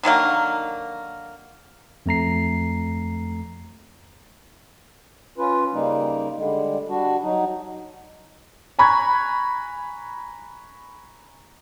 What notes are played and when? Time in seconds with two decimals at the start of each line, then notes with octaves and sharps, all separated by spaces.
0.03 D3 D#3 F#3 A#3
2.06 F2 A3 A#5 C7
5.38 C#4 F4 B4
5.73 C#3 G3 A#3 D#4
6.37 D3 G3 G#3
6.89 G3 D4 F#4
7.23 F#3 D#4
8.79 G#5 A#5 B5 C#6 F#6 G#6